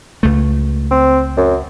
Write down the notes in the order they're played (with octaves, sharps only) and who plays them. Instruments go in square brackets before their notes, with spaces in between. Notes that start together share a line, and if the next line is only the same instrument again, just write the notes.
[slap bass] C#2 A3
[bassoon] C4
F#2